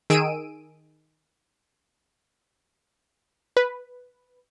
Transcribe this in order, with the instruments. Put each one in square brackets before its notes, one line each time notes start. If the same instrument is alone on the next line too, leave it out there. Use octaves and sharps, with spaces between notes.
[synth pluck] D#3 G#4 E6 D7 D#7
[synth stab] B4